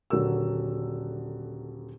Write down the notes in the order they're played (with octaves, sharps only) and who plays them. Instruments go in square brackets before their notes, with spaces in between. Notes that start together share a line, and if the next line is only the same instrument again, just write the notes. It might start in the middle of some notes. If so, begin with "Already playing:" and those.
[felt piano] D#1 D3 F#3 A#4 E6